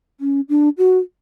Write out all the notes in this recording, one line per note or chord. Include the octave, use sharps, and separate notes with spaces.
C#4
D4
F#4